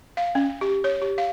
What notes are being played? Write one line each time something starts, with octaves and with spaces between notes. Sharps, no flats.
F5
C#4
G4
C#5
G4
F5